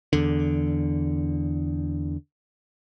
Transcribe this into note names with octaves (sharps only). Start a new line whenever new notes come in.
E2 D3